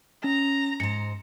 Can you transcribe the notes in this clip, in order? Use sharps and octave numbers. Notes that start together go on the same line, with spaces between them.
C#4 A#5
G#2 C5 C#7